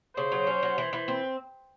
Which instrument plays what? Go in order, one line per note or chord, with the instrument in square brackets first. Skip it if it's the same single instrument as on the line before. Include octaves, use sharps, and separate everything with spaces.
[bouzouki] C#3 [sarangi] C5
[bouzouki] F#3
C#4
F#3
E3
E3
C4